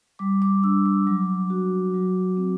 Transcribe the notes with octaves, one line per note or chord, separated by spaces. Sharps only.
G3 D6
D6
D4 E6
D6
F#3 D6
F#4
F#3
C4